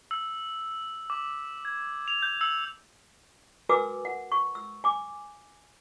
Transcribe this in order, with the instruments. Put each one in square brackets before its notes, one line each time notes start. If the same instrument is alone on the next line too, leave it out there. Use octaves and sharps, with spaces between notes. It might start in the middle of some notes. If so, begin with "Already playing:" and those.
[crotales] E6
D6
G#6
F7
G6
E6
[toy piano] F#4 A#4 B4 G#5 D6 E6
F#5
C#6
E6
G#5 D6